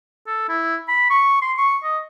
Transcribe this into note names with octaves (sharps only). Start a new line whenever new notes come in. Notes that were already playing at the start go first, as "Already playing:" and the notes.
A4
E4
B5
C#6
C6
C#6
D#5